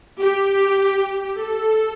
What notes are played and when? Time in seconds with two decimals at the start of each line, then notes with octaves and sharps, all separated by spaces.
0.18 G4
1.39 A4